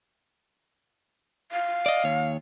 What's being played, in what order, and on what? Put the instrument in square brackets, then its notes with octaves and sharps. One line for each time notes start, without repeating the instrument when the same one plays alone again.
[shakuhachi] F5
[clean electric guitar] D5 D#5
D#2 C#5